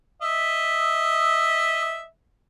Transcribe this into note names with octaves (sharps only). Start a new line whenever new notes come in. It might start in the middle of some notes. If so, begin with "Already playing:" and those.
D#5 E5